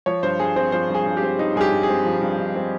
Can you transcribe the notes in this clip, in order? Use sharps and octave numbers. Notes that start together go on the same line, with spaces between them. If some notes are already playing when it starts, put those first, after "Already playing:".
F3 C#5
G2 C5
G2 G#4
C4 C5
F3 C5
G2
G#4
G2
G4
C4
F3 D#4
G2 G#4
G4
G2
G#4
C4
F3
G2
G2
C4